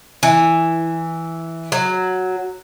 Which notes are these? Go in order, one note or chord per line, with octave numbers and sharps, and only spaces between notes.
E3
F#3